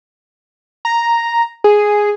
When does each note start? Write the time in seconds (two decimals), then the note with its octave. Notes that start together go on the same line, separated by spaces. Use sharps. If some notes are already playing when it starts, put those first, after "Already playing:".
0.85 A#5
1.64 G#4